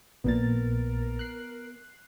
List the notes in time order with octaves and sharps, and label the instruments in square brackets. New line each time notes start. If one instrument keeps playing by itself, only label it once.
[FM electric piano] A#1 A#2 A6 [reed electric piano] B3 [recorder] A#4
[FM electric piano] F#6 C7